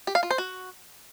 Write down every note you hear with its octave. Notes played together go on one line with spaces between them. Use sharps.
G4
F5
F4
C5
F#4